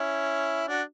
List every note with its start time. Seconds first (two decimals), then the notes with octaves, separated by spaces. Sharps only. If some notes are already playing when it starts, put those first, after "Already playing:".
Already playing: C#4 E4
0.68 D4 F#4